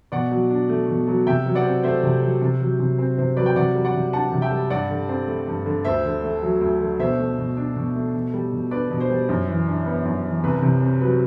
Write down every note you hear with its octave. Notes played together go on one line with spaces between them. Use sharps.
B2 D5 F#5
F#3
D4
A3
B2
F#3
C3 E5 G5
F#3
D5 F#5
C4
A3 C5 E5
C3
F#3
C3
F#3
C3
C4
C3 C5
F#3 B4 D5
G5
C3 D5 F#5
G3
D5 F#5
C3
D4 F#5 A5
C3
E5 G5
G3
G2 D5 F#5
D3
C4
A3
G2
D3
D2 C5 E5
D3
A3
F#3
D2
D3
B2 C5 E5
A3
B2
D4
B2
A3
B2
G3
B2
D4 B4 D5
B2
C5
G3
F#2
E3
D4
B3
F#2
E3
C2 B4
C3
C4
F#3 B4